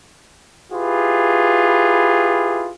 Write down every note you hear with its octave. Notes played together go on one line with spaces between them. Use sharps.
E4 F4 G4 G#4 B4